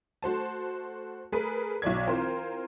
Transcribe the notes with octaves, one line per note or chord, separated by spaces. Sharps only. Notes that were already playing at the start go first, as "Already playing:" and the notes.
A3 F#4 C5 A5
A3 G#4 A#4 B4
B1 F#3 D5 G#6
E3 C4 F4 A#4 C5